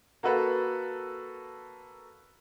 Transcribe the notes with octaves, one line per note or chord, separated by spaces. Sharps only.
A#3 F#4 A4 B4